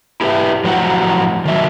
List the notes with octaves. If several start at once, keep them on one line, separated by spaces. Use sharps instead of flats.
E4 G4 B4 D5 E5
A2 F3 F#3 F#4 G4 F#5
D#3 F#3 E5